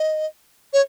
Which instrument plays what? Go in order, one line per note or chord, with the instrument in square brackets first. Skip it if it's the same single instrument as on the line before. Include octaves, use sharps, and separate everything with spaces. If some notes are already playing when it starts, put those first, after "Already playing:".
Already playing: [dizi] D#5
C#5